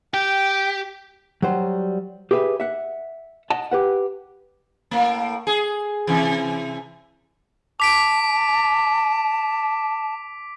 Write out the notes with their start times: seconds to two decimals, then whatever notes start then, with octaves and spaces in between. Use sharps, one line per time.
0.14 G4 G5
1.42 F#3 G3 C5
2.31 G4 G#4 B4 E5
2.60 E5 F#5
3.50 D#5 F#5 A5
3.71 G4 B4 F#5
4.91 A2 A#3
5.47 G#4
6.07 C3 E3
7.80 A5 D6 B6 D7